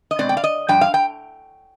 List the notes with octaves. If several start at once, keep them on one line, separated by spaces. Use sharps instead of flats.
D#5
B2 G#3 C4 D5
G5
F5
D#5
G2 F3 G5
F5
G5